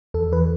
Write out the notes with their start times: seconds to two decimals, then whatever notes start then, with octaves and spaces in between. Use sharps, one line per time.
0.14 E2 A4
0.32 E3 B4